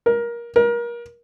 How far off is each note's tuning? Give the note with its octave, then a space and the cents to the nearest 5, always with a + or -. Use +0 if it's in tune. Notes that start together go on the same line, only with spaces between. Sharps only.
A#4 +20
A#4 +30